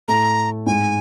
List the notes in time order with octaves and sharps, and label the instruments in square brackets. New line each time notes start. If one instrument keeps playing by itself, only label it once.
[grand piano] A2 A3 [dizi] A#5
[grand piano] G#2 G#3 [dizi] G#5